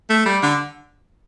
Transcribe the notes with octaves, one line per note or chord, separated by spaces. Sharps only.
A3
G3
D3